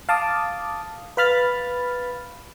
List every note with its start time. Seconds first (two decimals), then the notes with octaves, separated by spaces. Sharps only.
0.09 F5 A5 D6 D#6
1.17 B4 F5 B5 F6 A6